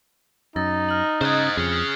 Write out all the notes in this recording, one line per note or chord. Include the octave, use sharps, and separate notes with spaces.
F#2 D#4 E6 A6 A#6
F6 F#7
C#3 C5 D#5 D#6 F#6 G#6
F2 C#4 G#4